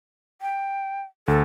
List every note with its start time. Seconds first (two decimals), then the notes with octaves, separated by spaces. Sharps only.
0.42 G5
1.28 D2 A4